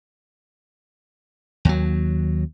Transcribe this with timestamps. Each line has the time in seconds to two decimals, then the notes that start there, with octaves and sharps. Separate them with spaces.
1.65 D#2 F#3